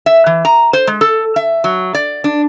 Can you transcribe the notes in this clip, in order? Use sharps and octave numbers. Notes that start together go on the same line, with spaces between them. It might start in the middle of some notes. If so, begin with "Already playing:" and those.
E5
E3
A#5
C5
G#3
A4
E5
F#3
D5
D4